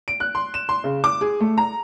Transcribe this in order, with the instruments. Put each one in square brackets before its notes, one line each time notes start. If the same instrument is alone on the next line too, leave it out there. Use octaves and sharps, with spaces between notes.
[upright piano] D7
F#6
C6
E7
C6
C#3
D6
G#4
A3
A#5